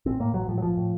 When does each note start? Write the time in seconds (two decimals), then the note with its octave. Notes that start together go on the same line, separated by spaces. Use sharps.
0.06 A1 C4
0.20 A2 A#3
0.34 A1 F#3
0.49 A2 F3
0.58 F#3
0.62 A1 F3
0.77 A2